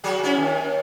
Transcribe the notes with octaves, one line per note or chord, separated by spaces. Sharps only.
F#3 F#4 G#4
C#4 E4
D#2